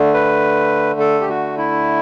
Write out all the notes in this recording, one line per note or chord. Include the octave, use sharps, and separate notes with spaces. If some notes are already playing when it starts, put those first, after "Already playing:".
Already playing: D3 A3
B4
A4
G4
F#4
E4